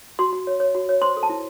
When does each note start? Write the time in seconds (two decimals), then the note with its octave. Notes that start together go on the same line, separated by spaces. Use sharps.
0.19 F#4 C6
0.33 F#4
0.47 C#5
0.60 C#5
0.75 F#4
0.89 C#5
1.02 C5 C6
1.17 A4
1.23 A5
1.30 E4